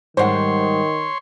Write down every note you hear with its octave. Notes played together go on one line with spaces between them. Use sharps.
G#2 D#3 G3 C5 C#5 F#5 C6